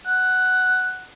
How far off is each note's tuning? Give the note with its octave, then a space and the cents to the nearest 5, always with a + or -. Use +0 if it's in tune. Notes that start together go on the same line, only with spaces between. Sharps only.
F#5 +5